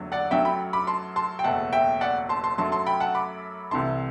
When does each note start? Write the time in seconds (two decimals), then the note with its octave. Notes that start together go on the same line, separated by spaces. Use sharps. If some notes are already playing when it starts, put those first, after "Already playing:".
Already playing: F#1 E2 D3 F#3 A3
0.12 D5 F#5
0.31 F#2 F#3 A3 E5 G5
0.45 G5 B5
0.73 B5 D6
0.87 A5 C6
1.16 A5 C6
1.39 G5
1.44 F#1 E2 B2 A3 F#5 A5
1.73 E5 G5
2.01 D5 F#5
2.29 A5 C6
2.44 A5 C6
2.58 F#2 F#3 A3 A5 C6
2.72 A5 C6
2.86 G5 B5
3.00 F#5 A5
3.15 B5 D6
3.71 C2 C3 E3 A3 A5 C6